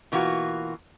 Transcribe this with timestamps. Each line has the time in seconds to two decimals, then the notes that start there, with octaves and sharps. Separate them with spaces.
0.12 B2 E3 A#3 F4 F#4